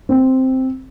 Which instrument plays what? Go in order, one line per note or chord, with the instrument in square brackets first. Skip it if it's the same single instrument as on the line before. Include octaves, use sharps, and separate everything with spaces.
[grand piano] C4